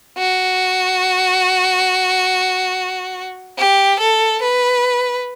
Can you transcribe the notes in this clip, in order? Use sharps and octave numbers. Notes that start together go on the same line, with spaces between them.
F#4
G4
A4
B4